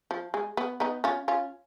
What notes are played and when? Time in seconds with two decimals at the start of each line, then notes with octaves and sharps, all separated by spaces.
0.11 F3
0.34 G#3
0.57 B3
0.80 B3 D#4
1.04 C#4 F4
1.28 C#4 F4